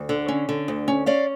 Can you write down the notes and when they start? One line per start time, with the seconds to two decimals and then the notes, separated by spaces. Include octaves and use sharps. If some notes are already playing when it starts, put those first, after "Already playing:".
Already playing: D2
0.09 D3
0.28 C#4
0.49 D3
0.68 D2
0.88 C#4
1.06 C#4 D5 F5